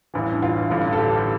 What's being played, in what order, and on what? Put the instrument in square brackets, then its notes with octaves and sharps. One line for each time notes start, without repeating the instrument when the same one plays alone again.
[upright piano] A1 G2 E3
F4
A1 G2 D3
A4
G4